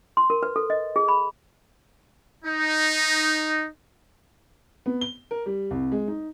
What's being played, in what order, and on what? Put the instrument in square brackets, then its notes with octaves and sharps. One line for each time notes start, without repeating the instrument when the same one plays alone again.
[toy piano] C6
A#4
B4
A4
D#5
G#4
B5
[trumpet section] D#4
[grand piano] B3
G7
A#4
G3
C2
G#3
D#4